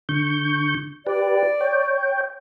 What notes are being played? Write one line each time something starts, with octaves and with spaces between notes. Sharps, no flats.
D3 C#6 G6
G4 B4 D5
C#5 G5